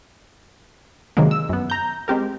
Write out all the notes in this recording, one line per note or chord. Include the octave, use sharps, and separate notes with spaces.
C3 D#3 F#3 G#3 A#3
E6
F#2 B3
A#5 G6
G#3 C4 G4 A#4